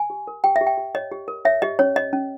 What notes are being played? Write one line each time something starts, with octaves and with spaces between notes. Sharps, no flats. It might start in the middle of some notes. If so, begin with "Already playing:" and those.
Already playing: G#5
G4
A#4
G4 G5
E5
G4
G5
G4
C#5 D#5
G4
A#4
C#5 E5
G4 D#5
C#4 C#5
C#5 D#5
C#4